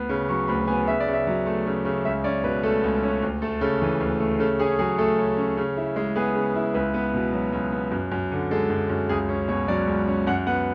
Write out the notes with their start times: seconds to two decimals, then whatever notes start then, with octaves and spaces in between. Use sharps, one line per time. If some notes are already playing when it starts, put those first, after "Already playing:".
Already playing: D2 B3
0.09 C#3
0.29 F#3 C#6
0.48 D2 B5
0.67 B3 G#5
0.88 C#3 E5
1.00 D5
1.07 C#3
1.13 E5
1.27 F#3
1.46 A3
1.66 C#3
1.85 C#3
2.05 C#2 E5
2.24 C#4 D5
2.44 B2 B4
2.63 A3 A4
2.84 C#2
3.03 C#4
3.22 D2
3.42 A3 A4
3.61 C#3 A4
3.82 E3
4.00 D2
4.20 A3
4.40 C#3 A4
4.59 C#4 G#4
4.79 F#3 G#4
4.98 A3 A4
5.18 C#3
5.37 C#4
5.57 C#3
5.77 E4
5.96 G#3
6.16 B3 G#4
6.35 C#3
6.56 E4
6.74 C#2 B4
6.94 B3
7.14 B2
7.33 F#3
7.53 C#2
7.72 B3
7.92 F#2
8.12 F#2
8.31 D3
8.51 G#3 A4
8.70 F#2
8.89 F#2
9.09 C#2 G#4
9.29 C#4
9.48 B2 C#5
9.68 F#3 D5
9.87 C#2
10.07 C#4
10.27 F#2 F#5
10.47 B3 F#5